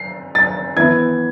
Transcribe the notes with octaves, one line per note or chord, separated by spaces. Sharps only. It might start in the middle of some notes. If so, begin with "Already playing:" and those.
Already playing: C7
A6
E3 B3 E4 G#6